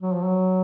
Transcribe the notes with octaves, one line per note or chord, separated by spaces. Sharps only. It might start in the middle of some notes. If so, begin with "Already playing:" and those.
F#3
F3
F#3